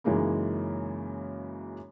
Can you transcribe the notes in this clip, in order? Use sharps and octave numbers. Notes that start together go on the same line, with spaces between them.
F#2 C#3 E3 G#3 A#3 D#4